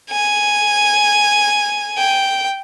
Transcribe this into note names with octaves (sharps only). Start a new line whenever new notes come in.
G#5
G5